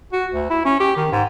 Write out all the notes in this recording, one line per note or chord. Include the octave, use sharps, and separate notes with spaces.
F#4
D2
E4
C#4
G4
D#3
G#2